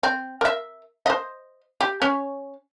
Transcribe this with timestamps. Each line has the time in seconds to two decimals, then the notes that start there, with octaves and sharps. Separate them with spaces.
0.03 C4
0.41 A#4 E5
1.06 C5 D#5
1.81 G4
2.02 C#4 C#5